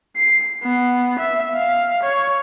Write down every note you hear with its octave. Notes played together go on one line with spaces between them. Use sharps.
C7
B3
E5
F5
C#5